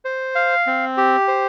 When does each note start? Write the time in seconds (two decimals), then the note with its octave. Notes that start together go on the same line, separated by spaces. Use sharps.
0.05 C5
0.35 F5
0.67 C4
0.97 G4
1.28 C5